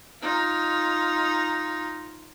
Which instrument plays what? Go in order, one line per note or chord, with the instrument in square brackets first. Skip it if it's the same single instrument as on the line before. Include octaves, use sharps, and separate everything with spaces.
[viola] D#4 F4